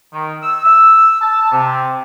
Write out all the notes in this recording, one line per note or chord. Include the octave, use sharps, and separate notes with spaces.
D#3
E6
E6
A5
C3